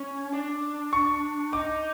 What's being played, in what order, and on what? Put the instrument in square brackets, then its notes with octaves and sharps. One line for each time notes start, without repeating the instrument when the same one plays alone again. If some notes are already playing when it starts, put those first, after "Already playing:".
Already playing: [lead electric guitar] C#4
D4
[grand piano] C#6
[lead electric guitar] D#4 [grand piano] D6